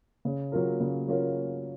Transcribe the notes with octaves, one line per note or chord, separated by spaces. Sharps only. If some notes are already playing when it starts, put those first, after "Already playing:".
C#3
F#3 C#4 F4 A#4
C#3
F#3 C#4 F4 A#4